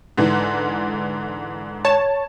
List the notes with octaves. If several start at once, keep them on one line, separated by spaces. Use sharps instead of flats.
G#2 D3 E3
C#5 A5